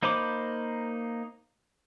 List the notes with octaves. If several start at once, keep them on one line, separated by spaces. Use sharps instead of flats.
A#3 D#4 C5 B5 D6